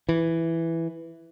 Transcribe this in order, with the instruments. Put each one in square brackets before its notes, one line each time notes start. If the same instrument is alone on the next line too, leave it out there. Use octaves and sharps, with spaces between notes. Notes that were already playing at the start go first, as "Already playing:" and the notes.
[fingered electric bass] E3